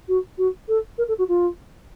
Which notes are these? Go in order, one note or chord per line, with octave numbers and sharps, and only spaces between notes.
F#4
F#4
A4
A#4
A4
F#4
F4